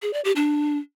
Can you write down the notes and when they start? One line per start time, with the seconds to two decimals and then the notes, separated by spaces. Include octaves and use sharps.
0.02 G#4
0.13 D5
0.25 G4
0.36 D4